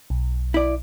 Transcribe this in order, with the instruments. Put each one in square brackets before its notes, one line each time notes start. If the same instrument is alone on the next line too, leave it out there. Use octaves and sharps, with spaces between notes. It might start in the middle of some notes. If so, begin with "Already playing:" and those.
[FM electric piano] B1
[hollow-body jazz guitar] E4 D5